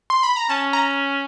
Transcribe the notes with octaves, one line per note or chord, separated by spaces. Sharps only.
C6
B5
A#5
C#4 A5
A#5